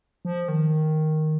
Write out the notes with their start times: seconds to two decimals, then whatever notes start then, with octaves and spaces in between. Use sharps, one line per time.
0.25 F3
0.48 D#3